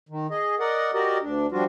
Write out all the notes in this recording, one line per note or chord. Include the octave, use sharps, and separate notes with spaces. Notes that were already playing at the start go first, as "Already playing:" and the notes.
D#3
G#4 D#5
A#4 D5 D#5 F#5
F#4 G4 A#4 D5 D#5
D2 D4
F3 G3 D4 F4 F#4